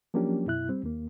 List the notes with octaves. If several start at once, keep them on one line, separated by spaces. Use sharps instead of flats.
F3 F#3 A#3 C#4 D4 G4
F#2 B2 E4 F#6
G3 C4
D#2 A#3